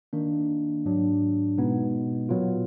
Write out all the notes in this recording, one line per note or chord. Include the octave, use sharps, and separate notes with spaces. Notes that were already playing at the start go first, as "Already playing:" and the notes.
D#3 A#3 D4
G#2 F#3 D4
B2 G#3 B3 D#4
A#2 F#3 B3 F4